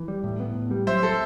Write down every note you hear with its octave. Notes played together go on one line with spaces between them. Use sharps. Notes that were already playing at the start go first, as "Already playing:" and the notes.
Already playing: E3
G3
A2
B3
A2
G3
F#3 C5 E5
A4 C5